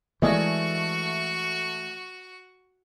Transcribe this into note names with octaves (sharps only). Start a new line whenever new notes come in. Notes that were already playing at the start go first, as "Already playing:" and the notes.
E3 G#3 A3 F#4 D5 D#5 G#5 C#6